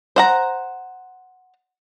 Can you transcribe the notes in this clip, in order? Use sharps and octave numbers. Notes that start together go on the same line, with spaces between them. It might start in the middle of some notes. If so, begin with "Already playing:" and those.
C5 F#5 A#5